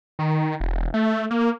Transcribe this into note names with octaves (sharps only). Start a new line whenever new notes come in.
D#3
E1
A3
A#3